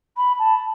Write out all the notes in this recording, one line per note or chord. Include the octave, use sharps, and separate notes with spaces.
B5
A5